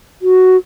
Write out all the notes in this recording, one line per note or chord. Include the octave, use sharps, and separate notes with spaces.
F#4